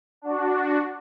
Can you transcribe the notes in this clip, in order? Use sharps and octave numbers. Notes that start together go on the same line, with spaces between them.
D4 F#4